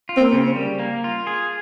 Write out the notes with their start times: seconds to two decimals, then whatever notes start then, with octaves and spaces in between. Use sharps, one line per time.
0.09 F4
0.17 C4
0.20 A#3
0.32 C#3
0.56 G3
0.79 A#3
1.04 F4
1.27 G#4